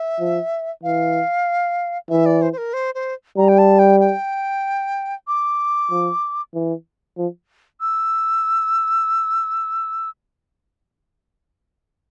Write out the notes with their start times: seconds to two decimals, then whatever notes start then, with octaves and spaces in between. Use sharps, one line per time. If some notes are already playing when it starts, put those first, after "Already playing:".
Already playing: E5
0.20 F3
0.83 E3 F5
2.10 E3 E5
2.26 D5
2.42 C5
2.53 C5
2.58 A#4
2.73 C5
2.95 C5
3.37 G3 A#5
3.48 G5
3.58 A5
3.79 G5
4.00 G5
5.28 D6
5.91 F3
6.54 E3
7.17 F3
7.81 E6